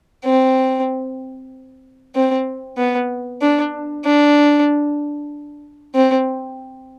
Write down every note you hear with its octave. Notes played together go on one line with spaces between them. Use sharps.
C4
C4
B3
D4
D4
C4